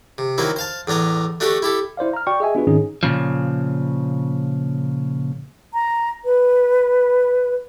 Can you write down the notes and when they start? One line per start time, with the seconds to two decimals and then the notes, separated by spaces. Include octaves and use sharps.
0.18 C3
0.38 D#3 F#3 A#3 C4 E4
0.56 C5 F5 A5
0.87 E2 A2 D4 A#5 D#6
1.40 A3 D4 F#4 G4 A4
1.62 E4 G4 A4
1.97 E4 C5 D5 F5
2.13 A#5 F6
2.27 F#4 D5 G5 C#6
2.40 G#4 D#5 E5 G#5
2.55 B3 D4 F4 F#4 G#4 B4
2.67 G#2 D#3 C4 C#4 D#4 G#4
3.03 A#2 C#3 F3
5.74 A#5
6.25 B4